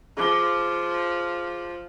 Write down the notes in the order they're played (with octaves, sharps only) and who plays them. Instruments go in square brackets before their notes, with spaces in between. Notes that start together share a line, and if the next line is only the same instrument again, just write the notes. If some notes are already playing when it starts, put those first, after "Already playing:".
[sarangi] F3 [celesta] G#4 D6 G7